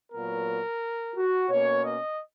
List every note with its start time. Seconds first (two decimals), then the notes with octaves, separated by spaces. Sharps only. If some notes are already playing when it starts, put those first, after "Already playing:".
0.12 A#2 F#3 B3 A#4
1.16 F#4
1.50 B2 A#3 C#4 C#5
1.85 D#5